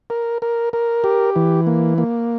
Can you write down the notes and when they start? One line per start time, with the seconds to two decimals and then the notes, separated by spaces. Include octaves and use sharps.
0.10 A#4
0.42 A#4
0.73 A#4
1.04 G4
1.36 E3
1.67 A#3
1.98 A#3